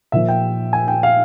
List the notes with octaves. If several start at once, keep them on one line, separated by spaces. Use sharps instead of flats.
A#2 F3 E5
G5
G#5
G5
F5